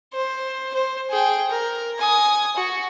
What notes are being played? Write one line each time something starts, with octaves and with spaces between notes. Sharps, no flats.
C5
C5
G#4 G5
A#4
G#5 D#6
F#4